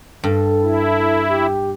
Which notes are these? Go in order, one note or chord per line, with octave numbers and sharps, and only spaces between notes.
G2 A4
E4
G4